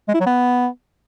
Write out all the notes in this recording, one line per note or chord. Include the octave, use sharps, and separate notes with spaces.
G#3
E4
F#3
B3